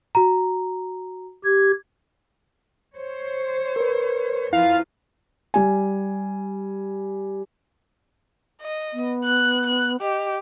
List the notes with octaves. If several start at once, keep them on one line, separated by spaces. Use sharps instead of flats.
F#4 A#5
G4 G#6
C5 C#5
A#4 B4
F2 E4 F4 B4 F5
G3 G#5
D#5
B3
F#6
F#6
G4 D#5